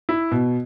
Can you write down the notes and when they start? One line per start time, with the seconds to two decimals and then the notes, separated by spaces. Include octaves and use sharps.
0.09 E4
0.32 B2